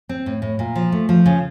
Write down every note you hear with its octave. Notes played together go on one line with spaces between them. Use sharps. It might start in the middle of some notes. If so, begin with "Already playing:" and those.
C4
A2
A2
A#2
F3
A3
F3
C#3